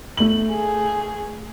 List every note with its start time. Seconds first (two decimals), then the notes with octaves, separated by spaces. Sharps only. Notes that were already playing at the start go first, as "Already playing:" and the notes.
0.17 A3 F#7
0.51 G#4